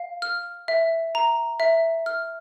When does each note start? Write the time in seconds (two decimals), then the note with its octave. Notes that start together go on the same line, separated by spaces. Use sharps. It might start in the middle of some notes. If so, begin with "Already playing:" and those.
Already playing: F5
0.22 F6
0.68 E5
1.15 A#5
1.60 E5
2.06 F6